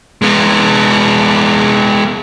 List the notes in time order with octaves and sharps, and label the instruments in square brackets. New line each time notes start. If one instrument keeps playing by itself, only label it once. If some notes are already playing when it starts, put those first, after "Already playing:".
[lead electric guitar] G#3 B3